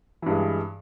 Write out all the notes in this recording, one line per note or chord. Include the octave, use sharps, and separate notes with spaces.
G2 E3 G#3